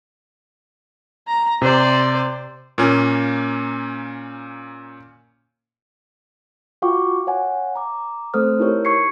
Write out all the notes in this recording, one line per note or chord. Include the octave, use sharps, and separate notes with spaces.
A#5
C3 C5 D5
A#2 A#3 C#4
F4 F#4 F5 G5 C#6 D6
C#5 F5 F#5 G#5
A#5 D6
A3 C4 A4 C5 D#6 F6
D#4 E4 G4 A#4 C#5
C#6 G#6 C7 C#7